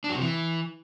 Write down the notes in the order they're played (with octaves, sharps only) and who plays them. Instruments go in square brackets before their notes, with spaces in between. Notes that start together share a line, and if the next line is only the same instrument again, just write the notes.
[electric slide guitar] D4
F#3
C3
E3